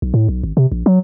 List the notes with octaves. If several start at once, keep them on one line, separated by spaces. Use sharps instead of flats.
B1
A2
B1
G#1
C3
A#1
F#3